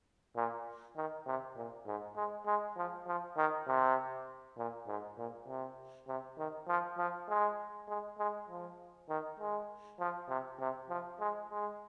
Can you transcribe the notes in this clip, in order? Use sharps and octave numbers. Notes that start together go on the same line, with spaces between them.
A#2
D#3
C3
A#2
G#2
G#3
G#3
F3
F3
D#3
C3
A#2
G#2
A#2
C3
C3
D#3
F3
F3
G#3
G#3
G#3
F3
D#3
G#3
F3
C3
C3
F3
G#3
G#3